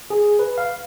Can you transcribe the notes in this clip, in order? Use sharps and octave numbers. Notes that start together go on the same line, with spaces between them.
G#4
B4
F5